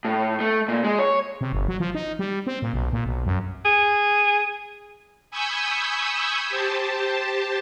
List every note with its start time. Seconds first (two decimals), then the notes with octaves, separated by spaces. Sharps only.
0.05 A2
0.40 A3
0.68 A#2
0.84 G#3
0.99 C#5
1.41 C3
1.53 G1
1.68 F#3
1.80 F3
1.95 D#4
2.19 G3
2.47 C4
2.62 A#2
2.74 B1
2.93 A#2
3.06 B1
3.26 F#2
3.65 G#4
5.31 G#5 B5 C#6 D#6 E6 G6
6.49 G4 C5 A5